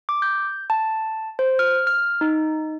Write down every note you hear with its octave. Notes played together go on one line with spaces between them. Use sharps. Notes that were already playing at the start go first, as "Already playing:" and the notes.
D6
G6
A5
C5
F6
F6
D#4